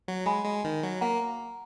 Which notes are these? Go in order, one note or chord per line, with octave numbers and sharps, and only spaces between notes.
F#3
G#3 G#5 B5
G#3
D#3
F#3
A#3 F#5 A#5